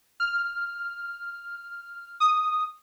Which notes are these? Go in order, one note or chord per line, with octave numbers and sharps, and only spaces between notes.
F6
D#6